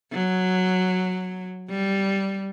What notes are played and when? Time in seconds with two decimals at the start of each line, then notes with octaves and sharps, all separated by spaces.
0.12 F#3
1.70 G3